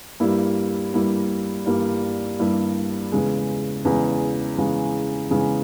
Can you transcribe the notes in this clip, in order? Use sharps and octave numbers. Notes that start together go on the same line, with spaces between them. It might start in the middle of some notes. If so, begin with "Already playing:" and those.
G2 G3 A#3 E4
G2 G3 A#3 E4
G2 G3 A#3 E4
G2 G3 A#3 E4
E2 C#3 G#3
E2 C#3 G#3
E2 C#3 G#3
E2 C#3 G#3